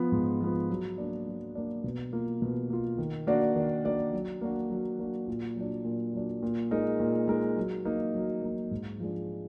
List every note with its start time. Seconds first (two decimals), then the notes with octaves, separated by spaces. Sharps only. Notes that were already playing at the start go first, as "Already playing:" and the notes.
Already playing: F3 B3
0.12 G#2
0.41 F3 B3
0.70 F#3
0.98 A#3 D4
1.27 F#3
1.55 A#3 D4
1.84 B2
2.13 A#3 F4
2.42 B2
2.70 A#3 F4
2.98 D#3
3.27 A#3 D4 F#4 D5
3.56 D#3
3.85 A#3 D4 F#4 D5
4.13 F#3
4.41 A#3 D4 F#4
4.70 F#3
4.99 A#3 D4 F#4
5.28 A#2
5.56 F#3 D4
5.85 A#2
6.13 F#3 D4
6.43 A#2
6.71 G#3 D#4 A#4
7.00 A#2
7.28 G#3 D#4 A#4
7.57 F#3
7.85 A#3 D#4
8.14 F#3
8.42 A#3 D#4
8.71 G#2
9.00 F3 G#3 D4